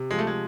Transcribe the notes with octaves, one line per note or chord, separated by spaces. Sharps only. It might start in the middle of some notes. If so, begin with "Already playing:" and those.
Already playing: C3
F3 G#3
A3
G#3